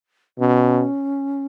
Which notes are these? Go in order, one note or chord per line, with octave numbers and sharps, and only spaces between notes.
B2 C#4